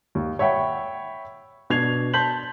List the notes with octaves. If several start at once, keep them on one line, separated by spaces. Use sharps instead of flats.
D#2
C#5 E5 F#5 G5 B5
B2 D4 G#6 C7 F7
A5 C6 G6 B6 F#7